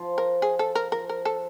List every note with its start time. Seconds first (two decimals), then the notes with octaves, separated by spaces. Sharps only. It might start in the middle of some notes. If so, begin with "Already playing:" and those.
Already playing: F3
0.18 A#4
0.42 G#4
0.59 A4
0.75 A#4
0.92 F3 A#4
1.09 A#4
1.25 A4